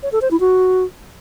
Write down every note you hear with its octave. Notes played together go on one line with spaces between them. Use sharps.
C#5
A4
C5
E4
F#4